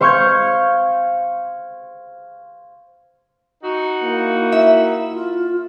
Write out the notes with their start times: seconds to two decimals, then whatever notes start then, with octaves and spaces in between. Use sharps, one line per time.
0.01 C5 F5 C#6 F6 G6 G#6
3.62 D#4 F#4
4.03 A#3 E4
4.52 E4 E5
5.13 F4